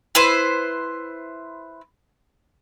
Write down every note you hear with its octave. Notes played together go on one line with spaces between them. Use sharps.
E4 B4 C5